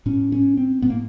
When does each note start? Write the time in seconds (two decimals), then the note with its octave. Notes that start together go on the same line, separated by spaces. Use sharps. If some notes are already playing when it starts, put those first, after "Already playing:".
0.06 A2 C#4
0.32 C#4
0.57 C4
0.82 A2 B3
0.90 A#3